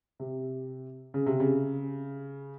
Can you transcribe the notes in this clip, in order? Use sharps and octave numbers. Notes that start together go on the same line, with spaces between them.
C3
C#3
C3
C#3